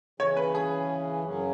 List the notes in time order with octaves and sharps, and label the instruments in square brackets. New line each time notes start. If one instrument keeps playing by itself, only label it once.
[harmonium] C#3 E3 C#4 [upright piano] C#5
[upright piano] B4
G#4
[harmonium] F#2 C#3 F#3 C#4